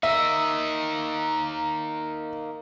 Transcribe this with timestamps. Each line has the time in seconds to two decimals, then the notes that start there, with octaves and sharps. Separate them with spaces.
0.03 A#3 D#4 E5